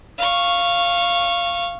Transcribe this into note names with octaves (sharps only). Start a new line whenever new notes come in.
F5 C#6